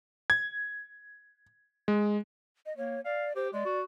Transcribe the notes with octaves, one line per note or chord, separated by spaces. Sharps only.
G#6
G#3
D#5
A#3 C#5
D5 F5
G4 C5
G#3 D5
F#4